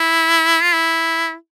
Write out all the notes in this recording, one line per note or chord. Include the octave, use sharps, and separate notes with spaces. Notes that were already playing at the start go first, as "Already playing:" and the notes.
Already playing: E4
F4
E4